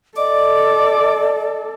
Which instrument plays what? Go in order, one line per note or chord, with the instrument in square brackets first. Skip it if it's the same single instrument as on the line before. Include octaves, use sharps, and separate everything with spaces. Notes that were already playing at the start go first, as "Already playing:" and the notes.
[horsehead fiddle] A4 [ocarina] D5 [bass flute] D#5 [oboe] D6